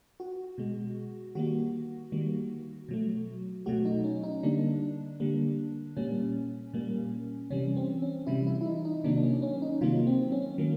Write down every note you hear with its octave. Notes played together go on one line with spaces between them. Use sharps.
F#4
B2 G#3
D#3 G3 A#3 F#4
D#3 G3 A#3
B2 F#3 A3
B2 F#3 A3 F#4
D#4
C#4
D#4
D3 G3 A#3 D4
D3 G3 A#3
A#2 G3 A#3 C#4
A#2 G3 A#3
C3 E3 G3 C#4
C4
C#4
C3 E3 G3 E4
E4
E4
D#4
D#4
C3 D#3 F#3 A#3 D4
D4
C#4
C#4
D#4
C3 D#3 F#3 A#3 F4
C4
C#4
D#3 F#3 A#3